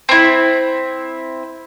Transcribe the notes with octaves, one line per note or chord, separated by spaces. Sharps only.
C4 E4